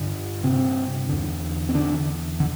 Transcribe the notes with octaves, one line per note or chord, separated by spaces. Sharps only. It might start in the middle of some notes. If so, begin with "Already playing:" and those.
Already playing: G2 D3
C3 C4
E2 D3
C4
D3 D4
D3